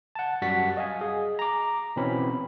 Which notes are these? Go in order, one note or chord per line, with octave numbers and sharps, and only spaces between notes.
F#5 A5
F#2 G3 F#4 F#5 A6 B6
D#5 F5 G#5
G#4
A#5 D6
B2 E3 C4 C#4 B5